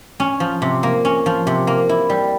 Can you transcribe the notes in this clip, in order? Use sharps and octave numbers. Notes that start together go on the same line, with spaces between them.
C#4
F3
C3
A#3
C#4
F3
C3
A#3
E4
G3